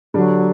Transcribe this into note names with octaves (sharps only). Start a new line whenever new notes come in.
D3 F#3 G3 D4